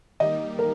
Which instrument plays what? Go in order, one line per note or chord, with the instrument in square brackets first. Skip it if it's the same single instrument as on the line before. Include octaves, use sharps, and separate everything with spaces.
[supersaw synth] D#3 G3 A#3 D#4 G4 [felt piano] D#5
[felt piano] A#4